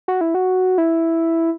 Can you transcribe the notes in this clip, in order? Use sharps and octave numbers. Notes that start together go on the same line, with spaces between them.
F#4
E4
F#4
E4